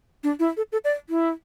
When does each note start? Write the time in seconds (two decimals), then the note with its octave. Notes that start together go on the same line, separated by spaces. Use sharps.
0.24 D4
0.40 E4
0.57 A4
0.72 A4
0.85 D5
1.10 E4